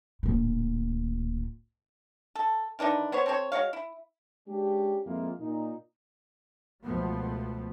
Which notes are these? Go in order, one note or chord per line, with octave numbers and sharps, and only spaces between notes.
D1 A#2
A4
D#3 E3 D4 D#4
B3 C5 C#5
C4 A4 C5 C#5
G#3 F#4 C#5 F5
E4
G#3 C#4 D4 G4
F2 G#3 A#3 C4 E4 F4
A#2 D#4
C#2 B2 F3 A3 B3